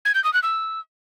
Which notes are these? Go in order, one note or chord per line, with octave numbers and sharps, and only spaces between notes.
G#6
G6
D#6
F#6
E6